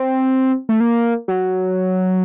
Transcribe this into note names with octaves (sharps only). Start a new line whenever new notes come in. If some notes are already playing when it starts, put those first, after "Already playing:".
Already playing: C4
A3
A#3
F#3